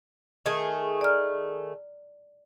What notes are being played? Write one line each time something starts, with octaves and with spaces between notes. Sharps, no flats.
D#3 A3 G#4
D5 A#5 F6